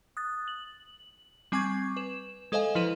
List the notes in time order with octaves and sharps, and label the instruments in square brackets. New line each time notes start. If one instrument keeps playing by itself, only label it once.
[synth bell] D#6 F#6 A6
F#7
G3 C4 G#5 C#6 D6 G#6
B4 E7
G#3 A4 C5 D#5 F5 G#5
F3 E4 B4 D#7